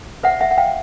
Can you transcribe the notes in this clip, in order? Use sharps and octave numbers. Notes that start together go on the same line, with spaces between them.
C5 E5 F#5
E5 F#5
F#5
C5 F5 G5